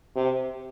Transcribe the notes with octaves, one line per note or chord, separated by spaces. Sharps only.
C3